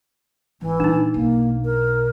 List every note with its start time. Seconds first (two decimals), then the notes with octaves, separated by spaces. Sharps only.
0.61 G#1 G#2 E3
0.80 A#2 G3 D4 D#4
1.14 B1 B2 A#3
1.65 A#4